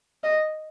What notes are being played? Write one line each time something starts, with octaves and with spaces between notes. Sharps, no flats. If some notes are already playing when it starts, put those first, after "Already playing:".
D#5